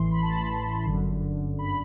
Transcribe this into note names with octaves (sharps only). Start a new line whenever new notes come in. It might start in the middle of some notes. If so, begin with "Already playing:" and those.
Already playing: A1 A2 E3 C6
B5
A5
B5
G1 F#2 D3
B5